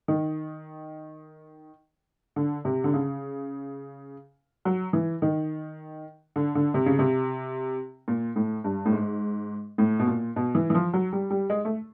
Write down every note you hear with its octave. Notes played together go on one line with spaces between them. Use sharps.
D#3
D3
C3
D3
C#3
F#3
E3
D#3
D3
D3
C3
C#3
C3
A#2
A2
G2
A2
G#2
A2
B2
A#2
B2
E3
E3
F3
F#3
G3
G3
G#3
A3